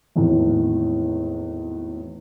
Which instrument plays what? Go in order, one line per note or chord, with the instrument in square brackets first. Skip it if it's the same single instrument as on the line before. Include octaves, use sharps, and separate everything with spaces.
[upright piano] G#1 E2 A2